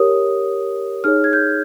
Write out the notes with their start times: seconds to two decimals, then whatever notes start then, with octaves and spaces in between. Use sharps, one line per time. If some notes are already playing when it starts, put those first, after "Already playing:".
Already playing: G4 A#4 C#5 D#6
1.04 D#4 G#4 C#5 F6
1.24 G#6
1.33 G6